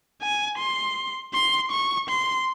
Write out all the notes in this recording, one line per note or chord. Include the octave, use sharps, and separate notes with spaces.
G#5
C6
C6
C#6
C6